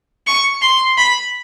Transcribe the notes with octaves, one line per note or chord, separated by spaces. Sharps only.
C#6
C6
B5